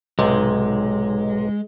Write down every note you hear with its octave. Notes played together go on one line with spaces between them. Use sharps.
B1 G#2 C3 G#3